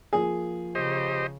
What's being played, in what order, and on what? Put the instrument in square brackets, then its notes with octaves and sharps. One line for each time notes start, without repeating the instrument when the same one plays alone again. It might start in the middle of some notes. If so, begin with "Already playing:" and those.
[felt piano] F3 A#3 [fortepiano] G#4
[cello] C#3 [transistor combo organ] G4 C5 D#5